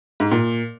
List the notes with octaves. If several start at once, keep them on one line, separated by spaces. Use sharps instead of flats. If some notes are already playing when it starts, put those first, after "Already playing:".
G#2
A#2